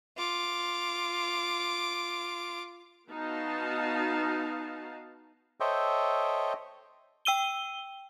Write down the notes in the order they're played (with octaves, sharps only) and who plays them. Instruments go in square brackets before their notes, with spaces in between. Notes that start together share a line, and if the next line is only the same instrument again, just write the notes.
[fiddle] F4 D6
[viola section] B3 D#4 F#4 F5 A5
[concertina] A4 C5 C#5 D#5 E5 G5
[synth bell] G5 E6 D#7 G7